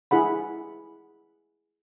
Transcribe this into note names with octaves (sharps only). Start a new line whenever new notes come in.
E4 G#4 F#5 B5